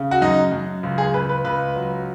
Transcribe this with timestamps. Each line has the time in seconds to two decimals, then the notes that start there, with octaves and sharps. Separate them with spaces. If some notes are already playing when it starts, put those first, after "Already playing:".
Already playing: C#3
0.11 F#4
0.21 F#2 D#4
0.52 F#2
0.83 C#2
0.98 G#4
1.14 C#2 B4
1.29 B4
1.44 C#2 B4
1.75 F#3